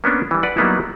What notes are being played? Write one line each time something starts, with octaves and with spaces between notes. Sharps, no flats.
A#3 B3 C#4 D4
E3 G3
B4 D5 F#5
F#3 G3 A#3 B3 D#4 E4